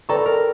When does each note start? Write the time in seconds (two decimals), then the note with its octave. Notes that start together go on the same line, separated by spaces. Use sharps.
0.09 A4 B4 D5 G5 A#5 C#6
0.26 A#4